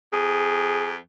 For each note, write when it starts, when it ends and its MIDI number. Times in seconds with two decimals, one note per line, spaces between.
0.13 0.96 41
0.13 0.93 68